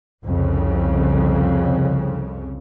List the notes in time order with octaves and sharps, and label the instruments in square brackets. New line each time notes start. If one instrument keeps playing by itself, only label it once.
[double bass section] C2 F2 C#3